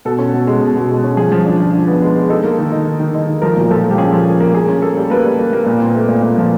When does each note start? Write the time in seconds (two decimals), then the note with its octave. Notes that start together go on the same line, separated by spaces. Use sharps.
0.05 B2 A4
0.19 C#4
0.33 B2
0.47 G#3
0.61 B2
0.75 B2
0.90 G#3
1.04 C#4
1.17 F3 G#4
1.32 F3
1.46 D4
1.60 F3
1.73 D4
1.87 B3
2.02 G#3
2.16 G#3
2.29 D#4 A4
2.43 A#3
2.58 D#3
2.72 D#4
2.85 D#3
3.00 D#3
3.15 D#4
3.28 D#3
3.42 F3 A#4
3.56 A#2 A#4
3.70 F3 A4
3.84 F3
3.91 G4
3.98 C#4 G#4
4.13 F3
4.27 A#3
4.40 A#3
4.54 A#3 G#4
4.68 C#4
4.82 A#3 A4
4.97 G3
5.10 A#3 B4
5.25 G3
5.39 A#3
5.53 A#3
5.66 A#2
5.80 C4
5.95 A3
6.08 A#2
6.23 A#2
6.38 F3